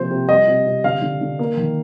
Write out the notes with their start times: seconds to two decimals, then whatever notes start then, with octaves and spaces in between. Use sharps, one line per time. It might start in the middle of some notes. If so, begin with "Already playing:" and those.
Already playing: C3 F3 A#3 C5
0.11 C3
0.29 G3 D#5
0.48 C3
0.66 C3
0.84 D3 F5
1.02 D3
1.21 D3
1.39 A#3
1.57 D#3